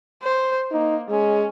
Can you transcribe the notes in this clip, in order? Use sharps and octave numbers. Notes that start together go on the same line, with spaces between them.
C5
A#3 D#4
G#3 C#4